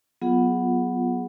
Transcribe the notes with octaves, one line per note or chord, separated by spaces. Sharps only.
F#3 B3 F4 G#4 F#5